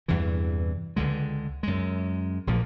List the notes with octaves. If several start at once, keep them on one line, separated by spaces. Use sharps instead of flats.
E2 G2 C3 E3
C#2 D3 G#3
F#2 G#3
A#1 A#2 F3 A#3